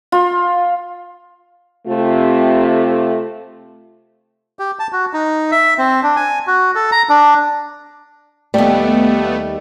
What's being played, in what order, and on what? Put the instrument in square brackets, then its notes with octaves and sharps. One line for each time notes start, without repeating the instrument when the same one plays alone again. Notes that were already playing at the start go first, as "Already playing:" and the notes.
[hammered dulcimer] F4
[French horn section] C3 A3 F4
[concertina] G4
A5
F#4
D#4
E5
C4
D4
G#5
F#4
A4
A#5
D4
[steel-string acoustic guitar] D#2 G3 [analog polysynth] A3 B3